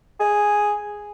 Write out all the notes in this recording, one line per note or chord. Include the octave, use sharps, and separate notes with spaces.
G#4